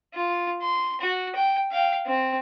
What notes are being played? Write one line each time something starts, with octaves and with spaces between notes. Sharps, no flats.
F4
C6
F#4
G5
F5 G5
C4